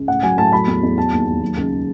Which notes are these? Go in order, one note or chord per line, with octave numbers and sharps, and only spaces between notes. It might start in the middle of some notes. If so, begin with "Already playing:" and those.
Already playing: C#2
A2 F#5
F#3 G#5
A2 A5
F#3 B5
E2
E2
F#3 A5
D#2
D#2
F#3
C#2